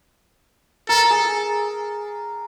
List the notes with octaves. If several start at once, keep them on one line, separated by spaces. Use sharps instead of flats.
A4 A#4
G#4